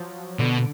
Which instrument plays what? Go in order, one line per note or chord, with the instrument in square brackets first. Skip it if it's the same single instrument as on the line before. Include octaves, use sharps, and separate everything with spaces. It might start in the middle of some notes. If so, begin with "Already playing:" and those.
Already playing: [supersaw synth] F3 F#3
[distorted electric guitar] B2 [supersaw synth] D3